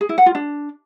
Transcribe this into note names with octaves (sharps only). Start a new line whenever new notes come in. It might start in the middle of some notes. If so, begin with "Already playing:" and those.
G#4
E4
F#5
F4
D4